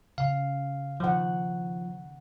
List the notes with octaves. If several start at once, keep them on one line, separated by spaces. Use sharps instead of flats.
C#3 F5
D#3 F3 F#5